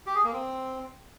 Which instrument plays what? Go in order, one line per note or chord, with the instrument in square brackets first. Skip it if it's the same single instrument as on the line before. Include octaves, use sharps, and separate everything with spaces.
[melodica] G4
G#4
A#3
C4